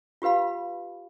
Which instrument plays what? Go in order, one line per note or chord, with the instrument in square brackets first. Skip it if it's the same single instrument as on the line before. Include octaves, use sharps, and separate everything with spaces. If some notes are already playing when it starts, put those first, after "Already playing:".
[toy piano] F4 G4 B4 F5 B5